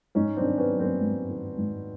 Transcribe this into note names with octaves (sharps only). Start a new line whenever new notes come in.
G#2 C#4 D#4
C4 D4
D#3
B3 C#4
F#3
A#3 C4
G#2
D#3
G#2